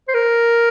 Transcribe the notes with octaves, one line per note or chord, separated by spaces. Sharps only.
C5
A#4